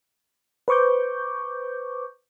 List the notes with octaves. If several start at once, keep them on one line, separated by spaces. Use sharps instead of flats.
B4 C5 C#6 D6 G6